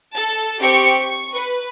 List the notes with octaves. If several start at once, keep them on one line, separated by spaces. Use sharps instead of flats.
A4 A5
C4 G4 C#6 C#7
C#6
B4